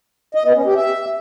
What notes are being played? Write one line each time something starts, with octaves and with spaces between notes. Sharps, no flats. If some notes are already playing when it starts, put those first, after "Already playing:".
D#5
B3
C#4
G4
E5